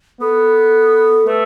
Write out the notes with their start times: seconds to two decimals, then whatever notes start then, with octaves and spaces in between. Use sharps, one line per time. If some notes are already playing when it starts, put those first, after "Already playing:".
0.21 B3 A4
1.27 A3 B4